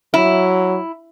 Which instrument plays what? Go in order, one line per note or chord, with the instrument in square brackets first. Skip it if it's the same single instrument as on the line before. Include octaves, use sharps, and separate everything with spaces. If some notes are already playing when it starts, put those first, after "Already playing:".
[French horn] F#3 [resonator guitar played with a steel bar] E4